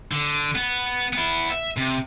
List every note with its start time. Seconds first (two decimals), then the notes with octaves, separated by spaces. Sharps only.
0.11 D3
0.55 B3
1.13 B3 E4
1.51 E5
1.77 C3